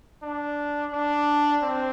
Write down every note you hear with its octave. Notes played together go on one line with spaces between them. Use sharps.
D4
D4
C4